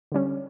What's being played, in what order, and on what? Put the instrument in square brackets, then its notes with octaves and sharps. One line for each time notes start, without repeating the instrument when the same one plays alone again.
[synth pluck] D3 G3 C#4